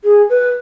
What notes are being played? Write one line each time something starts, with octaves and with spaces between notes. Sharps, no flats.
G#4
B4